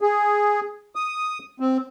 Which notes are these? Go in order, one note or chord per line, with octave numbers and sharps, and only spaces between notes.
G#4
D#6
C4